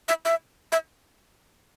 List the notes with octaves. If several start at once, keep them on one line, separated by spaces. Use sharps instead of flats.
E5
E5
E5